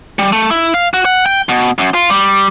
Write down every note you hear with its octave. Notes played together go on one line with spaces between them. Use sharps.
G3
A3
E4
F5
F#4
F#5
G5
B2
F#2
F4
G3